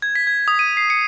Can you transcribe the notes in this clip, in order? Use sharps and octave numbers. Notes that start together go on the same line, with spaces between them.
G#6
B6
G#6
D#6
D#7
C7
C#7